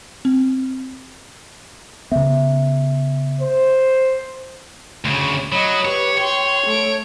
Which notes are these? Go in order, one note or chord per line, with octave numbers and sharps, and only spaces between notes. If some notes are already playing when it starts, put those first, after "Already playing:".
C4
C#3 B3 E5
C5
D2 C#3
F#3 D#5 B5
G4 B4 C#5
C#5 G5 C6
A3 D7